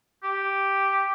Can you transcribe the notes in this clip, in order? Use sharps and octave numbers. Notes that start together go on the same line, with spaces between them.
G4